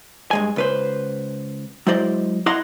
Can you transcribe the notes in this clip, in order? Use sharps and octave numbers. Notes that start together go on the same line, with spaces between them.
G2 G#3 G#5
C#2 B4 C5
F#3 G#3 E4 C5 D5 D#5
E4 D#5 F5 F#5 A#5 C6